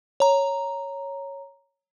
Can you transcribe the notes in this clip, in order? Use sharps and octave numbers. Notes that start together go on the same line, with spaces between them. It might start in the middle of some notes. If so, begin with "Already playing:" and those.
C#5 A#5